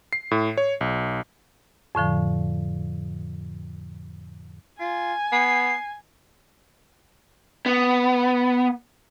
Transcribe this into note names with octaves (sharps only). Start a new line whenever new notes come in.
C7
A2
C#5
B1
F2 A2 D3 F3
F4 G#5
B3 C7
B3